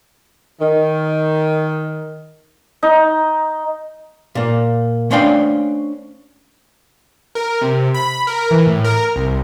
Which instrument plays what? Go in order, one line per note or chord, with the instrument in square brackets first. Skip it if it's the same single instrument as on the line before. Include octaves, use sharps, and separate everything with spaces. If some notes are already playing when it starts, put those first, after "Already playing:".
[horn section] D#3
[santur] D#4
[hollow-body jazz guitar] A#2 A#3
A3 C#4 D4 C5 F5 G5
[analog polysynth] A#4
C3
B5
A#4
E3
A2
A#4
C2